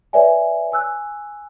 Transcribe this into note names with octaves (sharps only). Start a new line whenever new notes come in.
B4 C#5 D5 E5 G#5
G#5 E6 F#6